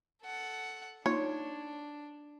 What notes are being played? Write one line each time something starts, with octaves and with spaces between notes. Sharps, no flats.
A4 F#5
A#3 D4 D#4 F4 C#5 C6